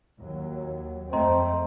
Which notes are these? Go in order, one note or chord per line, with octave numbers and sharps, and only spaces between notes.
D#2 F#3
F2 A3 C4 D#5 A#5 C6